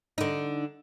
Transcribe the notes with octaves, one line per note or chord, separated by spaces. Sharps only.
D3 D#4